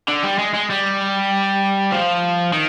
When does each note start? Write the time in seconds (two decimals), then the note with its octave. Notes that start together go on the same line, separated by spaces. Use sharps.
0.09 D3
0.24 G3
0.39 G#3
0.54 G#3
0.70 G3
1.92 F3
2.53 D#3